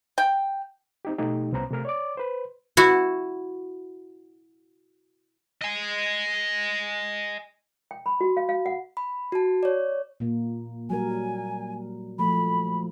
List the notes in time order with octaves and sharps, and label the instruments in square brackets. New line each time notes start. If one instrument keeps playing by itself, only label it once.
[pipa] G5
[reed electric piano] C4 D#4 G4
B2 A3 D#4 G4
C2 B3 C#4 C5 A#5
C3 A3 A#4 F6
C#5 D5 D6
B4 C5
[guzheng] E4 F#4
[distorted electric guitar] D#5 G#5
[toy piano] G5
B5
F#4
F5
F5
F#5
[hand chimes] B5
F#4 A5
C#5 D5
[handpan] A#2 A#3
[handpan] F#3 G3 A#4 [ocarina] G#5
[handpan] F3 A3 [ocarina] B5